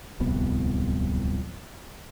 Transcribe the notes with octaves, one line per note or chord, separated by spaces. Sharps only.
D1 C2 F2 B3